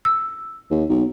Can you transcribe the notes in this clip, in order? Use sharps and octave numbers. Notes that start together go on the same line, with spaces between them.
E6
D#2
B1